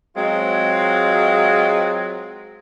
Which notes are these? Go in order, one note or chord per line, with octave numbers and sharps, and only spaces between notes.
F#3 G#3 C4 F4